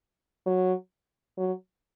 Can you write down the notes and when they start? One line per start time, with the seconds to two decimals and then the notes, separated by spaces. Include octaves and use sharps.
0.46 F#3
1.38 F#3